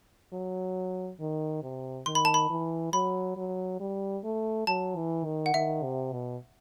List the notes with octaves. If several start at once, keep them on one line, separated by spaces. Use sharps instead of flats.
F#3
D#3
C3
D#3 C6
B5
A5
B5
E3
F#3 B5
F#3
G3
A3
F#3 A5
E3
D#3
F#5
D#3 E5
C3
B2